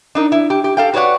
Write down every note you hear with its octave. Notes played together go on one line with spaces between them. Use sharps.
D4 D#4 A#4
E4
G4
G4
A4 F5 G5
F#4 B4 C#5 D5 F#5